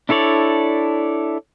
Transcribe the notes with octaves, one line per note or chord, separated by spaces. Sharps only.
D4 E4 A4 C#5 D5